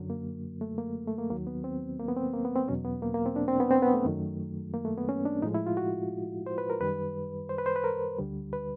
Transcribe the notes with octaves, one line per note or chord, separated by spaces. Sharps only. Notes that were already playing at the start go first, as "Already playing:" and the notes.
Already playing: F#2 D3 F#3
A#3
A3
A#3
A3
A#3
D#2 D#3 F#3 A#3
B3
C4
A#3
B3
C4
A#3
B3
C4
E2 B2 F#3 C#4
B3
A#3
A#3
C4
D4
C4
B3
C4
B3
A3
F#2 D#3 F#3
A#3
A3
B3
C#4
D4
A2 F3 G#3 D#4
E4
F4
F#4
C5
B4
A#4
F#2 D#3 G3 B4
C5
B4
C5
B4
A#4
D2 D3 G3
B4